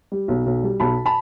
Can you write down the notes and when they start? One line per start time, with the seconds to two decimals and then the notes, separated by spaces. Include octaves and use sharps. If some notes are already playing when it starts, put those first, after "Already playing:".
0.12 G3
0.28 B1
0.46 B1
0.63 G3
0.80 B1 A5 B5
1.06 A5 B5